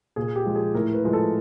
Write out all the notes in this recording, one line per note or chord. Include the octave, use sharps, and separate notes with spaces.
A#2 G#4
G4
F3 G#3
G#4
A2 A#4
B4
F3 G#3
A4